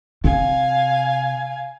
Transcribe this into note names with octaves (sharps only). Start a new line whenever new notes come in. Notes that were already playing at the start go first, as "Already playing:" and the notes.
C3 F5 G#5